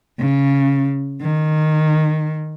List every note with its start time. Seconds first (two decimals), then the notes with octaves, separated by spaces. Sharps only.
0.19 C#3
1.21 D#3